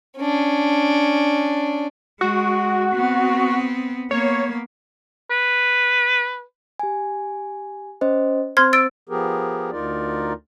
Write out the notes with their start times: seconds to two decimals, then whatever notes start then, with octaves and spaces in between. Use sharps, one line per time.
0.18 C#4 D4
2.21 G#3 F#4
2.94 B3 C4
4.11 A#3 B3 C#5
5.31 B4
6.79 G4 G#5
8.01 C#4 C5 D#5
8.57 C4 C5 C6 F6 G#6
8.73 E6 A6 D7
9.09 F3 B3 G4 G#4 A#4
9.71 D2 D#4 F4 A#4 D5